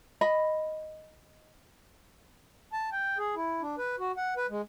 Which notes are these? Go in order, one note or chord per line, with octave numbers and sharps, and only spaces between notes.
D#5 B5
A5
G5
G#4
E4
D4
B4
F#4
F#5
B4
G#3